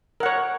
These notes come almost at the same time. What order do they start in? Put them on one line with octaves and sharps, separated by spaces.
A#4 F#5 C#5